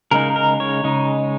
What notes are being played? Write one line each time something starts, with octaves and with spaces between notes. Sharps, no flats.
C#3 G#3 D#4 A#4
A#4
C#5
C#3 G#3 D#4